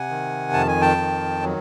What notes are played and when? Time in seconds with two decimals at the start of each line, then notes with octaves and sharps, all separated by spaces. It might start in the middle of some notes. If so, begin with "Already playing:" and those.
Already playing: C3 F#5 G#5
0.10 D#3
0.53 F2 A5
0.68 G#5
0.81 G5 A5
0.98 D#3
1.42 F#3